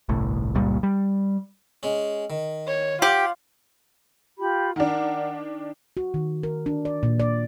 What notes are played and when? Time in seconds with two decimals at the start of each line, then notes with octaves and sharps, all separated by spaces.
0.09 G1 C2 A2
0.55 F#1 C#2 A#2 G3
0.83 G3
1.83 G#3 C#4
2.30 D#3
2.67 C#5
3.02 F4 G4 F#5
4.38 F4 G4 B5
4.76 D#3 D4 A#4 F#5
5.97 F#4
6.14 D#3
6.43 A#4
6.66 D4
6.85 D5
7.03 A#2
7.20 D5